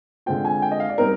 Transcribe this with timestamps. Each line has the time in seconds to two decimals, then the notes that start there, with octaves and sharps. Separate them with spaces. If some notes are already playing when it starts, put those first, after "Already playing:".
0.26 D3 G#3 C4 F4 G5
0.45 G#5
0.62 G5
0.71 D#5
0.80 F5
0.89 D5
0.98 G3 C4 D#4 A#4